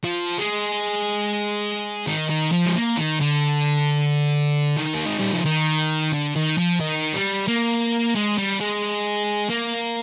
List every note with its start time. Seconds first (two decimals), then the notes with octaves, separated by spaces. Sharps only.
0.04 F3
0.38 G#3
2.07 D#3
2.29 D#3
2.52 F3
2.66 G#3
2.74 A#3
2.97 D#3
3.20 D3
4.77 D#3
4.94 A#3
5.06 G#3
5.19 G3
5.32 F3
5.45 D#3
6.13 D3
6.36 D#3
6.58 F3
6.80 D#3
7.14 G3
7.48 A#3
8.15 G#3
8.38 G3
8.60 G#3
9.50 A#3